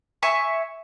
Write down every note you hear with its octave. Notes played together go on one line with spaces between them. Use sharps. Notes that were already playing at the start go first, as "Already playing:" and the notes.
E5 G#5 C#6